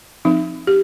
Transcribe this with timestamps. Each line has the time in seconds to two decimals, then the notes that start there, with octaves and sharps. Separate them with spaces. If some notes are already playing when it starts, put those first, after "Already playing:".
0.25 F3 C4 D#4
0.67 G4